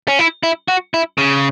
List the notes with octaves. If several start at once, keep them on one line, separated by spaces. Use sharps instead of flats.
C#4
E4
E4
F#4
E4
C#3